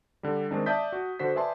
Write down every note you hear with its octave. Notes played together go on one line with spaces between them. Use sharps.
D3 G3
D#3 G#3 C4 D4 D#4
D5 E5 A5 D#6 G6 B6
F#4
D3 F#4 C5 B6
B4 D5 E5 G#5 A5 C6